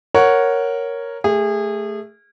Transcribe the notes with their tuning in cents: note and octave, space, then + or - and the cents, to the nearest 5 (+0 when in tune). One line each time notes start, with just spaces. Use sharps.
A#4 +0 C#5 +0 F#5 +0
A3 +0 G#4 -30